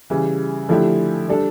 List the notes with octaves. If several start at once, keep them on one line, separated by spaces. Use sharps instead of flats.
C#3 E3 G3
D3 F3 A3 E4 G4
G3 D4 A4